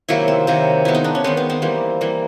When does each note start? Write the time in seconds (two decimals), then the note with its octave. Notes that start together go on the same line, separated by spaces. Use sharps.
0.09 C3 D#3 F#3 A#3 E4
0.28 C4
0.47 C3 D#3 F#3 A#3
0.85 D#3 G#3 B3 E4
0.95 D#4
1.04 D4
1.15 C#4
1.24 D#3 G#3 B3 C4
1.37 B3
1.50 C4
1.62 E3 G3 A#3
2.01 E3 G3 A#3